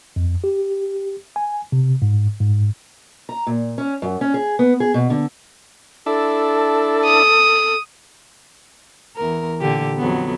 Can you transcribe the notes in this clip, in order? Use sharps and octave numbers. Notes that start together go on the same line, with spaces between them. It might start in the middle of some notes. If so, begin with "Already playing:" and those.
F2
G4
G#5
C3
G#2
G#2
A#5
A#2
C#4
F#2
C#4
G#4
B3
G#4
B2
D3
D4 E4 A4 A5
D#6
E2 A#4
A#2 D3 G4
F2 F#3 B3